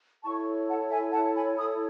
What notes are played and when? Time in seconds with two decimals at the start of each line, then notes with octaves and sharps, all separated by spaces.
0.24 E4 A4 C#5 A5 C#6
0.68 F#5 A5
0.91 E5 G#5
1.12 F#5 A5
1.35 G#5 B5
1.57 B5 D#6